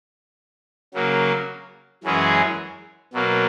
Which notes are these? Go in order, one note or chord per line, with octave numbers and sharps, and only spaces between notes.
C#3 F#3 A#3
F#2 E3 G#3 C#4 G#4
B2 F#3 A#3